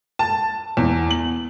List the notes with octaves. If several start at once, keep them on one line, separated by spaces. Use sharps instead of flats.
A5
E2
F#7